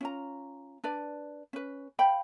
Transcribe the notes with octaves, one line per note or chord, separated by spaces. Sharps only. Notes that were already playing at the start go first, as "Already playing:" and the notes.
C#4 F4 A#5
D4 B4 D5
C#4 B4
C5 F5 G5 B5